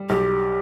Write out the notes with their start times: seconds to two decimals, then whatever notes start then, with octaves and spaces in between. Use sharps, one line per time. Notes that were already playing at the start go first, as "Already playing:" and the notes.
Already playing: G3
0.09 B1 G4